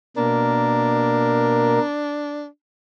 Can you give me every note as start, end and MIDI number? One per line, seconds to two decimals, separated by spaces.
0.17 1.79 47
0.17 1.79 58
0.17 2.46 62
0.17 1.79 70